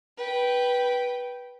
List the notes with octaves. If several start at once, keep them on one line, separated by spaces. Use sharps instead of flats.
B4 G5